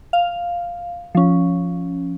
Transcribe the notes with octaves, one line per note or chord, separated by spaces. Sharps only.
F5
F3 C#4